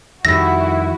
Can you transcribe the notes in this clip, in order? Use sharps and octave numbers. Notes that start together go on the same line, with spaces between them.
F2 D#3 G3 E4 F#4 E5 A#6